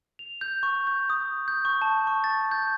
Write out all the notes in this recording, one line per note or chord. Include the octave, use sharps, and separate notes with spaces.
F7
G6
C#6
G6
D#6
G6
C#6
A5
C#6
A6
G6